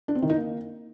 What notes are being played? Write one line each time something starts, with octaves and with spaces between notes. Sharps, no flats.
D4
C4
D#3
D#4
A#3